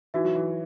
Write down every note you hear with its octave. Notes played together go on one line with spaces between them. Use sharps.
E3 D#4 F#4 B4 E5
F#3
E3